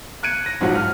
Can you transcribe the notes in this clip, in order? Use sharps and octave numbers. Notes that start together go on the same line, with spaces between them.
F#6 G#6 C#7 D#7
A#6
A#1 G#2 F3 F#3 F#5
F6